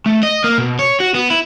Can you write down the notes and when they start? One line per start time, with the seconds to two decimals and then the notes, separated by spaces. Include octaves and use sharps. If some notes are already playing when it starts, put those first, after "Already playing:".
0.06 A3
0.23 D#5
0.44 A#3
0.58 B2
0.79 C#5
1.00 F#4
1.14 B3
1.30 E4